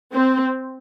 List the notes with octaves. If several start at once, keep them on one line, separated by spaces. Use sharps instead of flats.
C4